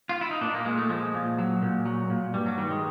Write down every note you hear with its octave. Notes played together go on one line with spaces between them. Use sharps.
F4
E4
D#4
A#2 D4
A#3
A#2 G#3
A3
F3 G#3
A#2
F#3
A#2
F#3
A#2
G2 G3
F#3
D#3 G3
G#3